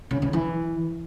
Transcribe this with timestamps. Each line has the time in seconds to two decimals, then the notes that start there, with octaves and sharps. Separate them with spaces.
0.11 C#3
0.22 C#3
0.33 E3